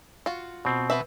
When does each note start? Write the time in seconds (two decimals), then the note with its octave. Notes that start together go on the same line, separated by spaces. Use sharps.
0.26 F4 F#4
0.65 B2 C4
0.90 B3 B4 E5